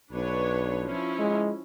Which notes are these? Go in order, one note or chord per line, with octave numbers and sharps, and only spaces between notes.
B1 D4 B4 C#5
F3 C#4 E4
G#3